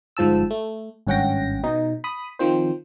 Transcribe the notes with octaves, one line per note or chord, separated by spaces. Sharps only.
G1 G#2 F3 A5 E6
A3
G#1 G2 C#4 F#5 G5 A#6
B2 D#4
B5 D#6
D#3 F3 C4 C5